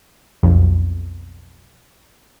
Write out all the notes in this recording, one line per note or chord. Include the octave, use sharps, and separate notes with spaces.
B1 F2